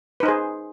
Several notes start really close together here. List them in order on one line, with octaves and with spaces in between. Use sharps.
B4 D#4 C5 G#4